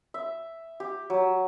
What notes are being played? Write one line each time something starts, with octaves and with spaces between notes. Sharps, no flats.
E5
G4
F#3